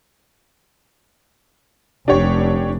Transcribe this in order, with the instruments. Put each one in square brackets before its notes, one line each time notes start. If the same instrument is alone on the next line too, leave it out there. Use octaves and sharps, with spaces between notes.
[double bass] F1 [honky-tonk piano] D4 G4 C#5